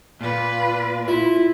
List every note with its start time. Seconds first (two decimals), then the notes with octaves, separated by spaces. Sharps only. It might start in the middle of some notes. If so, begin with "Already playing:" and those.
0.21 A#2 F4 B4
1.08 E4 F4